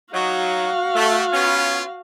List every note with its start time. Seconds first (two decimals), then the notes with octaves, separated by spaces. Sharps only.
0.14 F#3 D#4 F#4 F5
0.95 A3
1.33 B3 C#4 F4